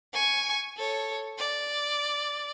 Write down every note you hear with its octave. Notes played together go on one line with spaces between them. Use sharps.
G#5 C#6
A4 C#5
D5